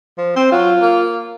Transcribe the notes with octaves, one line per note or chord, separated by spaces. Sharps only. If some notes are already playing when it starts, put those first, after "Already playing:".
F3
C4 C5
F#3 F4
A#3